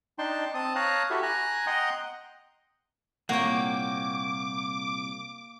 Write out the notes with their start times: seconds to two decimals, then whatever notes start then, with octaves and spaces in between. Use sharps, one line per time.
0.19 D4 D#4 G5 A5 C6
0.54 C4 A5 D#6
0.76 C#5 F5 A5 A#5 D#6 F#6
1.10 E4 F#4 G4 A4 E5
1.23 G#5 A#5 F#6
1.67 D#5 F#5 G5 A#5 C6 D#6
3.29 C2 A#2 A#3 C#5 F#5 G5 D6